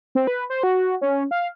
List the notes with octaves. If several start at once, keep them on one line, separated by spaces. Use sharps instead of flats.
C4
B4
C5
F#4
C#4
F5